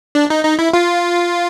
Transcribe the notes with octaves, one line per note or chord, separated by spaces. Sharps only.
D4
D#4
D#4
E4
F4